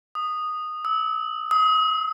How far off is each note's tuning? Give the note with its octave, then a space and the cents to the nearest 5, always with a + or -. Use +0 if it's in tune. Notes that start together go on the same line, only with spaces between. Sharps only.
D#6 -10
E6 -30
D#6 +30